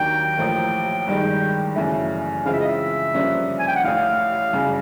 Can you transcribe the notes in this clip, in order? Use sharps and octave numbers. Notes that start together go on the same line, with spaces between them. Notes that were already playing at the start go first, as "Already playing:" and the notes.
Already playing: D#2 D#3 F#3 A#3 D4 G5
A1 A2 F3 A#3
G1 G2 D#3 G#3
F#2 C#3 E3 A3
C#3 E3 G#3 C4 F4 F5
E5
D#5
E5
G2 D3 F3 A#3 C#4
G#5
G5
F#5
A1 A2 E3 F5
G1 F#2 C#3